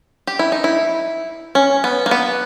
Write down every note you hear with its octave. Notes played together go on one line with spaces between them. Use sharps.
G4
E4
D#4
E4
C#4
B3
A#3
B3